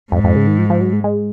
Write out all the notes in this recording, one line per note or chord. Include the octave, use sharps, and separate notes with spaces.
F2 G#2
F2
C#3
D#3
F3
F3
F#3
G#3
G#3